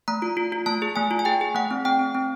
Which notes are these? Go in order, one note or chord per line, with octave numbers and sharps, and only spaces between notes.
A3 A#5
F4
F4
F4
A3 A5
G#4
A3 G#5
F4
G#5
G#4 G5
G#4
A3 F#5
C4
C4 G5
C4
C4